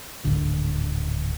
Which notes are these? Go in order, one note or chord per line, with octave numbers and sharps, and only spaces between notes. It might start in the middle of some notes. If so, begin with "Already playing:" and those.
D1 G#1 D3